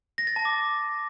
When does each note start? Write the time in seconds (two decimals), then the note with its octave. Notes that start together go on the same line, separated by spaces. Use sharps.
0.18 A#6
0.27 A6
0.36 A5
0.45 D6